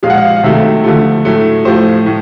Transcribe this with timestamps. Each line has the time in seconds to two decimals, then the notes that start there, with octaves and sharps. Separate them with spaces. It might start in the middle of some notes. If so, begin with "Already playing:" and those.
0.03 A#2 F3 G#3 F5
0.10 F#5
0.18 F5
0.36 F5
0.43 C3 D#3 F#3 A3 E5
0.84 D3 F3 A3
1.25 A2 F#3 A3
1.65 A2 F3 A3 C5
2.06 A2